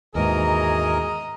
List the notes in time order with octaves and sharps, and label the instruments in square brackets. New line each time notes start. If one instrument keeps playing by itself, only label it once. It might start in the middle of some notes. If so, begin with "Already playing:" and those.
[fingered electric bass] D#2 G#2 [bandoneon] B2 E3 A#4 [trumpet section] G#4 [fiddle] D#5 A#5